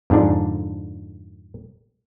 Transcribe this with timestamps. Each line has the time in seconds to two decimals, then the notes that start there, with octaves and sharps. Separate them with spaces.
0.10 F2 G#2 D3 D4